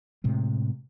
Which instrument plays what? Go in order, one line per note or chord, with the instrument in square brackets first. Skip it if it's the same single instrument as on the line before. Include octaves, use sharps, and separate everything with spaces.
[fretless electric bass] A2 C3 G#3